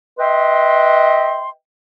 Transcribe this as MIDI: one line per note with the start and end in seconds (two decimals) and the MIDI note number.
0.19 1.49 71
0.19 1.49 75
0.19 1.49 76
0.19 1.49 79
0.19 1.49 84